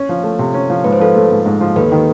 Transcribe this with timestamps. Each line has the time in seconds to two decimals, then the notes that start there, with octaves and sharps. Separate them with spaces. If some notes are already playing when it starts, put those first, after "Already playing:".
Already playing: C#4
0.09 F3
0.23 A3
0.39 C3
0.54 C#4
0.70 F3
0.84 G#2 B4
0.93 C5
1.00 F3 A4 B4
1.15 A3
1.30 G#2
1.46 G#2
1.61 F3
1.76 D#2 A4 B4
1.92 D#3